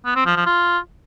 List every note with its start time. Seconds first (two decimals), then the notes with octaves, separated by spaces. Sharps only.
0.05 B3
0.16 C4
0.26 F3
0.36 F3
0.46 F4